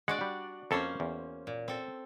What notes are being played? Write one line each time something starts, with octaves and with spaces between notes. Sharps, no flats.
G#3 D4 F#4 D5 F#5
G3
F2 A#3 C#4 A4 C5
E2
A#2
C4 A4